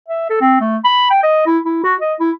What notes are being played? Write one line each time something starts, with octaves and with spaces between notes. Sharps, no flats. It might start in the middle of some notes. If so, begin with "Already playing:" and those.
E5
A4
C4
A3
B5
G5
D#5
E4
E4
F#4
D#5
E4